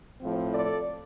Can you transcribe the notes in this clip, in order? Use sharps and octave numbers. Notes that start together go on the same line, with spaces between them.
A2 F3 C4
A4 D5